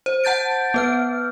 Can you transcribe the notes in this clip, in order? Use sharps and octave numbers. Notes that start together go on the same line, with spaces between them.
C5
F#5 A5 G6 A6 D7
B3 B4 F6